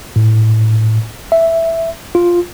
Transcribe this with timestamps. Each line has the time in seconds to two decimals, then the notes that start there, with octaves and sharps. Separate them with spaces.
0.16 A2
1.32 E5
2.15 F4